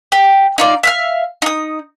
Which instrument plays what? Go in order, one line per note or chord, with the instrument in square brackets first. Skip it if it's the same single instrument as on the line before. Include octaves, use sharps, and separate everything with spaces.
[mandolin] G4
D#4 F4 D5
E5 F5 F6
D#4 D#6